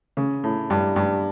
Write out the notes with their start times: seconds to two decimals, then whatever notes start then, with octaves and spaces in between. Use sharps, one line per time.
0.17 C#3
0.44 A2
0.70 G2
0.96 G2